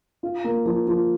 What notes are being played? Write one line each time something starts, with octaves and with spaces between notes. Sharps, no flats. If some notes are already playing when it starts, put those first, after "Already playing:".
F4
A#3
F3
F3